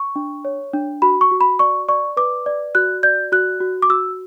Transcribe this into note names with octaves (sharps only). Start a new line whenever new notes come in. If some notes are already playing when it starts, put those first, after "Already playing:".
Already playing: C#6
D4
C#5
D4
F#4 B5
C#6
F#4
B5
D5 C#6
D5 C#6
B4 D6
D5
F#4 F#6
D5 G6
F#4 F#6
F#4
D6
F#4 E6